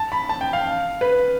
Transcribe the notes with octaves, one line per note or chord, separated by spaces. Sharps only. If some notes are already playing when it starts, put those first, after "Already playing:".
Already playing: A5
B5
A5
G5
F5
B4